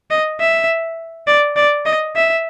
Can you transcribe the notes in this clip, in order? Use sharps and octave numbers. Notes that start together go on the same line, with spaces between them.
D#5
E5
D5
D5
D#5
E5